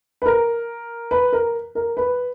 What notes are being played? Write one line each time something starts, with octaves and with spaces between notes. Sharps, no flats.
B4
A#4
B4
A#4
A#4
B4